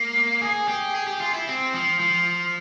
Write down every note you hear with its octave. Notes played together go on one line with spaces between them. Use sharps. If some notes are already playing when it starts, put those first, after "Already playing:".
Already playing: A#3
G#4
G4
G#4
G4
F4
E4
C4
F3
F3